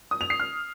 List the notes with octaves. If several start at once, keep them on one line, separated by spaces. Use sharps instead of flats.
D#6
F7
C7
F6